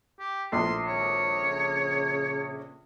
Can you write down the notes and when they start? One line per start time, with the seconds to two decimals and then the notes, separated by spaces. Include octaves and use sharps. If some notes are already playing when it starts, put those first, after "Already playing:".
0.19 G4
0.52 A#1 A2 A4 C6
0.87 G#1 C#5
1.41 C#3